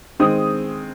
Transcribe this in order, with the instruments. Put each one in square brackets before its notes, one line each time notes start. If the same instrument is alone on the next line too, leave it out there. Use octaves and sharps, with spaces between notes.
[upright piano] D#3 G#3 C4 D#6